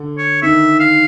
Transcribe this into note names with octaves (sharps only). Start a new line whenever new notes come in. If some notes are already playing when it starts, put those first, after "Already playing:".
Already playing: D3
C#5
D#3 E5
F5